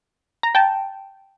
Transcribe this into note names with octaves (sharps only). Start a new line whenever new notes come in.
A#5
G5 A5